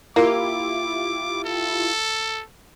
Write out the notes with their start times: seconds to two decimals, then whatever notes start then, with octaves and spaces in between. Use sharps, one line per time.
0.16 A#3 E4 F4 G4 D6
1.44 A4